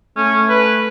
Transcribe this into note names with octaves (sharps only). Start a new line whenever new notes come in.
A3 C#4
B4